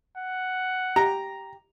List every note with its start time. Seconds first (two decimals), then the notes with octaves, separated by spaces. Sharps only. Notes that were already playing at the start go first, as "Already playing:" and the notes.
0.17 F#5
0.96 G4 A#5